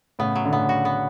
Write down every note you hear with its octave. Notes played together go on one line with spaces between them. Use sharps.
A2 C#3 B3
F#3
D3
A2 C#3 B3
F#4
B3